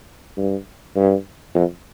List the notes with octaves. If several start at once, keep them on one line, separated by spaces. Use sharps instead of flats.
G2
G2
F2